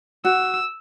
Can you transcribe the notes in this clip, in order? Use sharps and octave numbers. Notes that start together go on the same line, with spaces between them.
F#4 E6